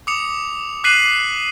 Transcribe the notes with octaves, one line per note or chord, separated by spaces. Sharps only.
D6 D#6 C#7 F7
D6 F#6 B6 C7 D#7 F#7